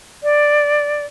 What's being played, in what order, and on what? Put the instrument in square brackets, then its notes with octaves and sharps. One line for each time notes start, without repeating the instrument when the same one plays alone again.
[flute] D5